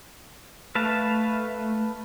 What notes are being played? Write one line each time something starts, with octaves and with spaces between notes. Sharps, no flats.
A3 B4 F5 A5